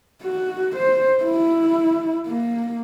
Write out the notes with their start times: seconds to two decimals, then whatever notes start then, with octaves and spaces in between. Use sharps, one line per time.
0.23 F#4
0.76 C5
1.24 E4
2.27 A#3